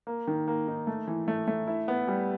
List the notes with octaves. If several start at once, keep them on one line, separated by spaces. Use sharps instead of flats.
A#3
D#3
A#3
D#4
A3
E3
A3
A3
E4
B3
G3